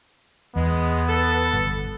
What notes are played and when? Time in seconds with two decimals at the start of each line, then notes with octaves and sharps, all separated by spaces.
0.56 E2 G#3 B3
1.08 A4
1.53 G1